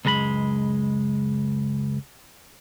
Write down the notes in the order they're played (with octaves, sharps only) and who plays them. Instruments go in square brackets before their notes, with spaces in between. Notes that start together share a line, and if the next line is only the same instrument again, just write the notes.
[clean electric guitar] C#2 F#2 G#3 A#5 B5